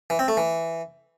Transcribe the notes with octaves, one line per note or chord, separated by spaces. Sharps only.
E3
C4
A3
E3